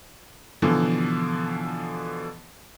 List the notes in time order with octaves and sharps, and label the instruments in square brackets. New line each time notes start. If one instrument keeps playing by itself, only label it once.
[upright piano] B2 D3 E3 F3